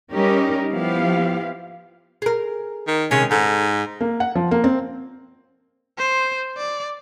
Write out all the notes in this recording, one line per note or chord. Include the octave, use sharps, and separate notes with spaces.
G3 C#4 D#4 G4 A#4
F3 B3 E4 G4 F5
G#4 A#4
D#3
C3 D#3 G#3 C#4
G#2 D#4 A4
A#3
F#5
F3
A#3
C4
C5
D5